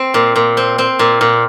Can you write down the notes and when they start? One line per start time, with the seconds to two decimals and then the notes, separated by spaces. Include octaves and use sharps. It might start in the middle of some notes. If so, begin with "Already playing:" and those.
Already playing: C4
0.14 A#2
0.36 A#2
0.57 C4
0.78 C4
0.99 A#2
1.21 A#2